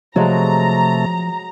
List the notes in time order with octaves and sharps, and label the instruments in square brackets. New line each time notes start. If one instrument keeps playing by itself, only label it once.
[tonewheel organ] C3 A3 [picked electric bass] F3 [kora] F#3 G#3 [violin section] A#5